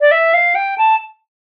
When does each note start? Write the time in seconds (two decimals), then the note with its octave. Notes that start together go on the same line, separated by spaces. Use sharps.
0.01 D5
0.11 E5
0.34 F5
0.55 G5
0.78 A5